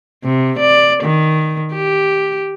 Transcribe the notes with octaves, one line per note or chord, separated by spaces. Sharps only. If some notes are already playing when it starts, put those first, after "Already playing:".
C3
D5
D#3
G4